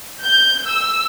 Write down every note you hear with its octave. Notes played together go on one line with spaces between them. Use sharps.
G6
E6